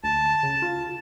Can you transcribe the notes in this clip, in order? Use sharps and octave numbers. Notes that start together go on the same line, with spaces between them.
D2 A5
C#3
F4